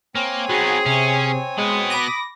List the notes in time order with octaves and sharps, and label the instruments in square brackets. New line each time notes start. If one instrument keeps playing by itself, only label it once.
[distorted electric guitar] A#3 [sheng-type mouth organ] C4 C#5 G#5
[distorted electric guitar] B3 D#4 [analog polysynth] F#4 [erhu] G#4
[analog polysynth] C3 [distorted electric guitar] C#4
[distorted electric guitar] B2 B3 [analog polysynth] G#3 [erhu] D#6
[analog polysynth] B5 D6 A#6